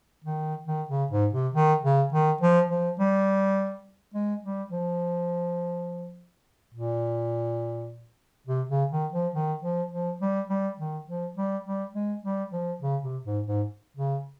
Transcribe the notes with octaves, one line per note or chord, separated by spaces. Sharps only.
D#3
D#3
C#3
G#2
C3
D#3
C#3
D#3
F3
F3
G3
G#3
G3
F3
A#2
C3
C#3
D#3
F3
D#3
F3
F3
G3
G3
D#3
F3
G3
G3
G#3
G3
F3
C#3
C3
G#2
G#2
C#3